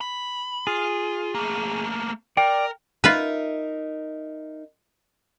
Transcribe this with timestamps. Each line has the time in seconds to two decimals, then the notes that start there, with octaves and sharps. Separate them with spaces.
0.01 B5
0.67 F4 G#4
1.35 A3 A#3
2.37 A#4 D5 G5
3.04 D#4 F4 A#4 B4 E5